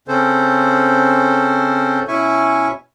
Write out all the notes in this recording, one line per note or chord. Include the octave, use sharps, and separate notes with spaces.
C#3 C4 C#4 A4 C5
B2 C#4 E4 E5 G#5 C#6